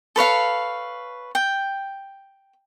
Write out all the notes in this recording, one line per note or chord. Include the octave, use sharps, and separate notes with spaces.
A4 B4 C#5 F5
G5